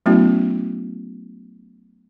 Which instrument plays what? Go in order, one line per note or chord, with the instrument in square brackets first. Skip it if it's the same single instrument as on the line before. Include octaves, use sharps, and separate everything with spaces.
[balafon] F#3 A3 B3 C#4 E4 F#4